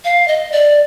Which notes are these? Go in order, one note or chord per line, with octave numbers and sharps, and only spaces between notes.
F5
D#5
D5